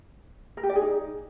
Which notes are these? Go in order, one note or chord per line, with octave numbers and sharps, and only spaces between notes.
A#4
G4
D5
G#4
D#4